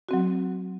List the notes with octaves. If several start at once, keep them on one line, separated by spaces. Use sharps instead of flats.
F#3 C4 F#4